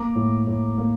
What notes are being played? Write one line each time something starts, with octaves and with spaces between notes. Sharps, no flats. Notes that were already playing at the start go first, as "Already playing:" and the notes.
Already playing: A#3 A#5 D6
A2
A2
A#3